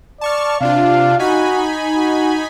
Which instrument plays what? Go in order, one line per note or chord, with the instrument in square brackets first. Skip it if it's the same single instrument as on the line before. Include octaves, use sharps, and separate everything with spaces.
[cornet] D5 [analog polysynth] A5 C#6 F6
[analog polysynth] C3 D4 F4 [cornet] F5
[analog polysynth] D#4 G#5 B5 [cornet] F#4
[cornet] F#4